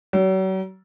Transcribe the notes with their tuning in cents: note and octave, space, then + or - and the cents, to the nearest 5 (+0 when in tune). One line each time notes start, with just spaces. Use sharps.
F#3 +40